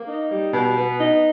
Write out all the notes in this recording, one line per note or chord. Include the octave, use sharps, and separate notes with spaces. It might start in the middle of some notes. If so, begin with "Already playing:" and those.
Already playing: A#3
D#4
G3
B2
B3
D#4